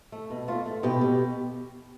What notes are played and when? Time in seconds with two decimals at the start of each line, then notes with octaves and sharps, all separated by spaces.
0.12 A3
0.30 B2
0.48 A3 F4
0.66 A3
0.83 B2 G4
1.01 B2